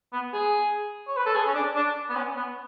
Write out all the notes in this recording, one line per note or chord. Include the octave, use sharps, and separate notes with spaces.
B3
G#4
C#5
B4
A4
G#4
C#4
D4
D4
B3
C#4
B3